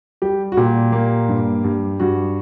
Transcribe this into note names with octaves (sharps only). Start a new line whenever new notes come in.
G3 G4
F#4
A#2 G4
A#3
G2
G2
G2 F#4